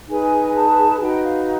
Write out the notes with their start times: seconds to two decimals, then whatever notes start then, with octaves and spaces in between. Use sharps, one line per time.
0.08 D#4 G#4 B4 G#5
0.54 A5
0.99 D#4 F#4 B4 G5
1.23 F5